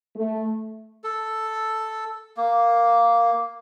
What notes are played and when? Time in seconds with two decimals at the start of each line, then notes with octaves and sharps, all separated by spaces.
0.16 A3
1.04 A4
2.37 A#3